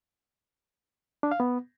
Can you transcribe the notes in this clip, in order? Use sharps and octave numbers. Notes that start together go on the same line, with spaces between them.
D4
F5
B3